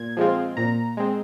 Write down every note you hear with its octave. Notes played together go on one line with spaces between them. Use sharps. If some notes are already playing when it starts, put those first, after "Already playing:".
Already playing: A#2 G#6
F3 G#3 C4 F4
A#2 A#5
G#3 C4